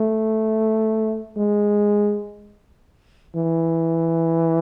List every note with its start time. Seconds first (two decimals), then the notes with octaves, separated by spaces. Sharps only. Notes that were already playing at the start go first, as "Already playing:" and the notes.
Already playing: A3
1.37 G#3
3.36 E3